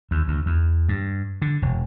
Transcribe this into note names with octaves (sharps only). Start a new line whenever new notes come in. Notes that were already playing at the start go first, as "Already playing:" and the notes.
D#2
D2
E2
G2
D3
E1